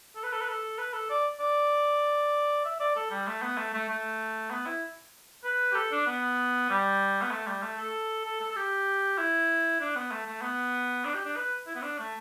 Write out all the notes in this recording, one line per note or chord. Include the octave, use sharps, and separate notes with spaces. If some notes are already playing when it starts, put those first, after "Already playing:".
A4
B4
A4
B4
A4
B4
A4
D5
D5
E5
D5
A4
G3
A3
B3
A3
A3
A3
B3
E4
B4
G4
A4
D4
B3
G3
B3
A3
G3
A3
A4
A4
A4
A4
G4
E4
D4
B3
A3
A3
B3
D4
G4
D4
B4
E4
B3
D4
A3